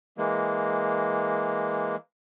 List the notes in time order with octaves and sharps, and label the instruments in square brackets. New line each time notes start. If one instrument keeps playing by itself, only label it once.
[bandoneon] E3 G#3 A#3